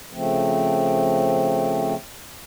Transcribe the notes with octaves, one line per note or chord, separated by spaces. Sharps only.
C#3 F3 A3 C4